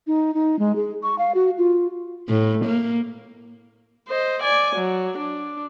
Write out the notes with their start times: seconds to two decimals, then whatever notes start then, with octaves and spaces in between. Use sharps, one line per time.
0.07 D#4
0.34 D#4
0.59 G#3
0.75 G#4
1.03 C#6
1.18 F5
1.34 F#4
1.58 F4
2.29 A2
2.65 A#3
4.09 C5 D#5
4.43 D5 G#5
4.76 F#3
5.18 D4